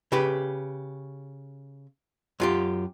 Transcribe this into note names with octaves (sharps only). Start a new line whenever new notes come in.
C#3 G4 B4
F#2 F4 G4